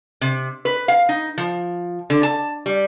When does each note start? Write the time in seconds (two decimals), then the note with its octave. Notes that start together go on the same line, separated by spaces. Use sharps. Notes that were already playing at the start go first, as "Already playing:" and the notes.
0.21 C3
0.65 B4
0.88 F5
1.09 D#4
1.38 F3
2.10 D3
2.23 A5
2.66 G3